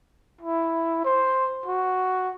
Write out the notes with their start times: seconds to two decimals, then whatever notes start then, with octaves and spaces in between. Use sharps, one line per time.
0.42 E4
1.05 C5
1.66 F#4